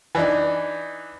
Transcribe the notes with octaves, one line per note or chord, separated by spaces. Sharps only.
E3 D4 D#4